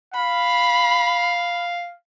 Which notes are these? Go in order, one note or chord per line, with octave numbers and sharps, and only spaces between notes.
F5 B5